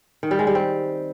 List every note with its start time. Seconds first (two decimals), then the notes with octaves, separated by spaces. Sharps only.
0.23 D#3
0.31 G3
0.39 G#3
0.47 G3
0.55 C4